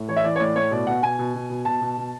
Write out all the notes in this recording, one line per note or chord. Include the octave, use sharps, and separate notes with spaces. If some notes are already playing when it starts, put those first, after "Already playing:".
Already playing: A2
E3 C#5
E5
E3 D5
C#5
A2 D5
A2 C#5
B2 D5
B2 F#5
B2 G#5
B2
B2
B2
B2 A5
B2
B2